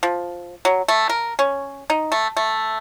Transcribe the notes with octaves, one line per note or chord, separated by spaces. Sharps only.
F3
F#3
A3
A#4
C#4
D#4
A3
A3